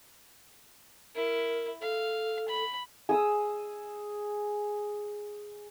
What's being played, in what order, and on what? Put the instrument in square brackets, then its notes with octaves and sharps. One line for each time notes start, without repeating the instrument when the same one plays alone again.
[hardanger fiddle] E4 [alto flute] A#4
[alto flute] A4 [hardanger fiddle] F5
[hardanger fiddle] B5
[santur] G#4 D#6 E6